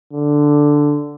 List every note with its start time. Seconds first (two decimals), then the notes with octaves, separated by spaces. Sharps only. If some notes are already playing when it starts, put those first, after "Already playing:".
0.13 D3